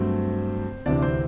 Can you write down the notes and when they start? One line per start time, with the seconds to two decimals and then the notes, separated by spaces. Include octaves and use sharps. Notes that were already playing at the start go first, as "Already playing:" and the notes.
Already playing: G2 F#3 A3 C4 C5
0.86 D2 C3 E3 D4 D5
1.02 C4 C5